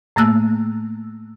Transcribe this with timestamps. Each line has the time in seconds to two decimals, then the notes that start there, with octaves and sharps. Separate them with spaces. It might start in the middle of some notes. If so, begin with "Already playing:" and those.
0.16 A2 A3 A#3 E6 F#6